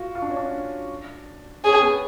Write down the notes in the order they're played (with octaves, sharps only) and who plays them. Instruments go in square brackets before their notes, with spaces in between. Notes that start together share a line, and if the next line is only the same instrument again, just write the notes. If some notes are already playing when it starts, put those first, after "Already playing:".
Already playing: [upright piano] F4 F#4
F4
D4
C#4
D4
[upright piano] C#4 [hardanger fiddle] G#4
[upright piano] B3